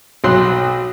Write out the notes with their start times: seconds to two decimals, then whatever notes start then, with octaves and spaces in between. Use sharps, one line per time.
0.24 B1 F#3 C6 F#6